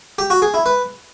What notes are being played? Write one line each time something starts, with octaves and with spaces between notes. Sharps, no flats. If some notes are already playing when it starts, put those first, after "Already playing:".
G4
F#4
G#4
E4
B4